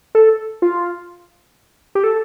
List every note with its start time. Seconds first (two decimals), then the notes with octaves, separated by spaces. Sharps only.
0.15 A4
0.62 F4
1.95 G4
2.04 A4